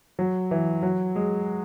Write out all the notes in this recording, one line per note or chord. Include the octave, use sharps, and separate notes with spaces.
F#3
E3
F#3
G#3